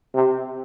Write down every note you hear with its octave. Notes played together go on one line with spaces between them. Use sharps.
C3